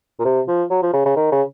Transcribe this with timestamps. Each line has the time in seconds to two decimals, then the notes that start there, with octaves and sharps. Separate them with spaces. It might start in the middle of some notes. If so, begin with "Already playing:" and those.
0.19 A#2
0.25 C3
0.48 F3
0.70 F#3
0.82 F3
0.93 C#3
1.06 C#3
1.16 D#3
1.32 C#3